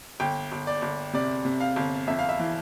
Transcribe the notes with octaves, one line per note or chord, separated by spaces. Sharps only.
G1 G5
G1
D5
G1
C3 D5
C3
F5
G1
F2 E5
F5
E5
E3